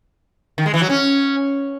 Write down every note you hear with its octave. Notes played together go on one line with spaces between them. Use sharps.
D#3
G#3
E3
F#3
C#4